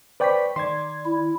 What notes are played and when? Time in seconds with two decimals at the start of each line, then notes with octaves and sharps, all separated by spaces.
0.20 B4 C5 D5 G5 C#6 B6
0.56 D#3 D5 C6 G#6
1.05 E4